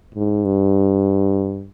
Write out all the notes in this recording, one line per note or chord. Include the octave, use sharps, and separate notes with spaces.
G#2
G2